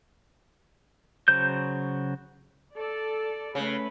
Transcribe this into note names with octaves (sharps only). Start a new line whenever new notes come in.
C#3 F#3 C5 G6
A4 D5
C#3 A3 B4